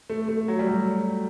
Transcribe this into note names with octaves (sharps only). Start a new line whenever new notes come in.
A3
A3
F#3
G3
F#3